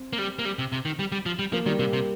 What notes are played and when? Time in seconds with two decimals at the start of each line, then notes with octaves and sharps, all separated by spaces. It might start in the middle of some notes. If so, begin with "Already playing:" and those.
Already playing: C4
0.13 A#3
0.18 G3
0.39 A#3
0.45 G3
0.59 C3
0.72 C3
0.85 D#3
0.99 G3
1.12 G3
1.26 F3
1.39 G3
1.53 F3 A#3
1.66 D#3 G3
1.79 C3 A#3
1.93 C3